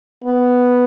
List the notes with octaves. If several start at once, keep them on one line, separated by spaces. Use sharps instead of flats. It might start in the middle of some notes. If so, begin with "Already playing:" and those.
B3